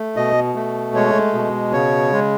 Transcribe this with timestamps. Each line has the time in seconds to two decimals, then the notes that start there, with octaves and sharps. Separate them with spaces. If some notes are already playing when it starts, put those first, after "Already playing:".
Already playing: A3
0.16 B2 D#5
0.55 A3
0.95 G#3 C#5
1.34 B2
1.73 C#3 C#5
2.12 G#3